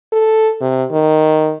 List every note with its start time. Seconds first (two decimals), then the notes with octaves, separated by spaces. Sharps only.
0.12 A4
0.61 C3
0.91 D#3